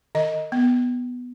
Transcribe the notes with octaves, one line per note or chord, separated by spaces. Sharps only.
D#3 D#5
B3